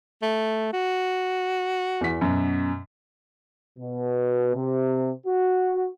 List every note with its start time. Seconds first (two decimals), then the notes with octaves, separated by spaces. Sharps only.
0.22 A3
0.73 F#4
2.01 E2 B6
2.21 F#2 B2
3.79 B2
4.55 C3
5.27 F#4